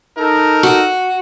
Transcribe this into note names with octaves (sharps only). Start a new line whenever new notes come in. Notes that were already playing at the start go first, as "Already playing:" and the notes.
D#4 A4 A#4
F#4